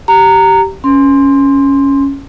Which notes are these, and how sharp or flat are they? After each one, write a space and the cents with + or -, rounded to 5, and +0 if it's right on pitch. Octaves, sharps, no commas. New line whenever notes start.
G4 -15 A#5 -15
C#4 +0 C6 +0